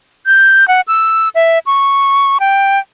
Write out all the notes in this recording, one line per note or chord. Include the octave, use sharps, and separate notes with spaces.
G6
F#5
E6
E5
C#6
G5